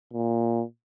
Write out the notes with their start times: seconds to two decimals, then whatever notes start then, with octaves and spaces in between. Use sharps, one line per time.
0.13 A#2